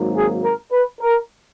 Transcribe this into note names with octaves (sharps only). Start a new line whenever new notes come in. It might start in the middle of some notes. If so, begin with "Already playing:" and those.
Already playing: G#1 G#2 F#3 A#3
G#4
A#4
B4
A#4